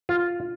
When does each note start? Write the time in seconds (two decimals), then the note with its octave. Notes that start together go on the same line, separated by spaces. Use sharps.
0.09 F4